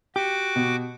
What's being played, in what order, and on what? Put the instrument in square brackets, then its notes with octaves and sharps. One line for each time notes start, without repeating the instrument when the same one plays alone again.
[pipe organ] F#4 D6 [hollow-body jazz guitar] G4
[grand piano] B2